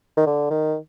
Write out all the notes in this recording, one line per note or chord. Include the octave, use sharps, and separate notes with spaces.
D#3
D3
D#3